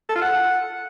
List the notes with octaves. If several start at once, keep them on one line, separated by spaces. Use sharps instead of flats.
A4
F4
F#5